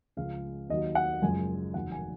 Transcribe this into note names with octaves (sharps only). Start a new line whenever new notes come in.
C#2 C#3 F3 G#3 F5
D#2 D#3 F#3 D#5
F#5
F#1 F#2 F3 G#3 G#5
F1 D#2 D#3 F#3 F#5
G#5